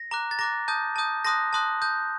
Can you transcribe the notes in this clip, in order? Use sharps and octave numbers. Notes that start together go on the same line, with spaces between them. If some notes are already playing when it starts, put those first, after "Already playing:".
Already playing: A#6
A#5 D6 F#6
A6
A#5 D6 F#6 A#6
A5 D#6 G6
A5 D#6 G6
A5 C6 D#6 F#6 A#6
A5 C6 D#6 F#6
A5 D#6 G6